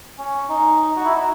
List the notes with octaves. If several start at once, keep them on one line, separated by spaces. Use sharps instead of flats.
C#4
D#4
F#4
E4
D#4